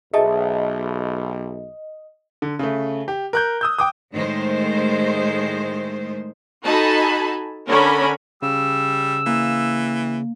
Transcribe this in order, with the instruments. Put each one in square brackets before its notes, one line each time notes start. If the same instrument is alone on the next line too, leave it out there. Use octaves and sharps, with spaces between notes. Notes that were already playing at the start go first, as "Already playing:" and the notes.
[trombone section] B1 [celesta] G#4 E5 A5 [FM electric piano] D#5
[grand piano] D3
C#3 A3
G4
A#4 F#6 G6
D#6 E6 G6
G5 D6 D#6
[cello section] A2 D#3 G#3 A3 C5
[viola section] D#4 F#4 A4 G#5 A5 B5
D3 C#4 A#4 C#5 B5
[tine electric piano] C#3 [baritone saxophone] G3 [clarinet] E6
[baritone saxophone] E3 [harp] A#3